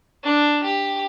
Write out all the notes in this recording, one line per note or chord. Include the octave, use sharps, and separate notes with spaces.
D4
G4